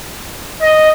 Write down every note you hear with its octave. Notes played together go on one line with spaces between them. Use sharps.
D#5